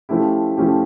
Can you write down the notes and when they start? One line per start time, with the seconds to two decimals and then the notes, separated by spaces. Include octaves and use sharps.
0.09 F3 A3 C#4 E4 G4
0.57 F3 A3 C#4 E4 G4